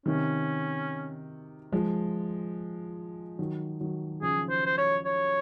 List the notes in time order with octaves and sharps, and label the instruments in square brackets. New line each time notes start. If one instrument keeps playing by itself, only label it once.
[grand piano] C3 D#3 [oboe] C#4
[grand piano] F3 G#3
D#3 F#3
D#3 F#3
[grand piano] C#3 F3 [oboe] G#4
[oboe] C5
C5
C#5
C#5